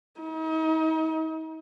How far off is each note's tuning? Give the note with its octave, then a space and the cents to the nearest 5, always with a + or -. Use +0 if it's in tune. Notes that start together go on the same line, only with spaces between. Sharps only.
D#4 +40